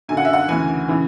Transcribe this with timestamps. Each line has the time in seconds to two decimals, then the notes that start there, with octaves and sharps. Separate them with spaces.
0.08 F#2 D3 G#5
0.17 F#5
0.25 E5
0.33 F#5
0.48 D2 C#3 E3 G#5
0.88 C#3 E3